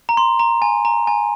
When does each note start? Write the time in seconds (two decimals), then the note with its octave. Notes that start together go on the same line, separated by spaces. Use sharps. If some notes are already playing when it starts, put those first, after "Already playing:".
0.09 A#5
0.17 C6
0.40 A#5
0.62 G#5
0.85 A#5
1.07 G#5